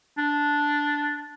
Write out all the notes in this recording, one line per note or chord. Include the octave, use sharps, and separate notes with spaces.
D4